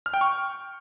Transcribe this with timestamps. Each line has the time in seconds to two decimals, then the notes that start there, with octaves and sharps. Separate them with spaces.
0.06 F6
0.14 G5
0.21 C#6